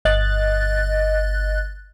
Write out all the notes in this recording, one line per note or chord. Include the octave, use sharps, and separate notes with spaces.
G1 D#5 F#6 A6